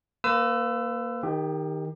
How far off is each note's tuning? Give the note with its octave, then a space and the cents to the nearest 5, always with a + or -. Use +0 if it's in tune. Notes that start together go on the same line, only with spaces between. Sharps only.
A#3 +0 B4 +40 E6 +15
D#3 +0 G4 +25